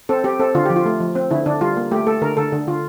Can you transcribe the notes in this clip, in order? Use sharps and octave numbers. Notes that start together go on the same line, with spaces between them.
C4 A4
C4 G4
C4 A4
D3 F4
F3 G4
F4
A3
F3
C4
D3 E4
D3 D4
G3 F4
A#3
A3 G4
A3 A4
D3 A#4
D3 A4
D3
D3 F4